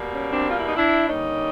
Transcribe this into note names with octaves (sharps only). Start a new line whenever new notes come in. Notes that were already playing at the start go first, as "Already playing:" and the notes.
Already playing: B2 G3 A#3
C#4
C4 D4
F4
E4
D#4
D4 E4
D3 G3 A#3 C#4 D#4